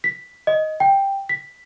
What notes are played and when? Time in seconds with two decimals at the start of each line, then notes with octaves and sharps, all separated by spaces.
0.04 B6
0.47 D#5
0.80 G5
1.29 B6